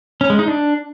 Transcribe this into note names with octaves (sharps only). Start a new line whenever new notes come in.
C#4
G#3
D#4
D4